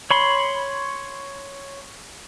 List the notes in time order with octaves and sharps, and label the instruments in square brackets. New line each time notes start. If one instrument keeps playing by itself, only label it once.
[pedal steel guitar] C#5 B5 C6